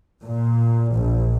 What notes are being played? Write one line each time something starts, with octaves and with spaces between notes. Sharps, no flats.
A#2
A#1